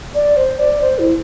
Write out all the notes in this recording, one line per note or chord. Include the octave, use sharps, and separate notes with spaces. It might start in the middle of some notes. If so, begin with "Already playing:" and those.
D5
C5
D5
C5
E4